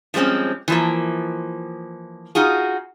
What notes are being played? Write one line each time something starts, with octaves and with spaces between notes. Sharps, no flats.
F3 G3 G#3 C4 C#4
E3 F3 A#3
D#4 F4 F#4 G#4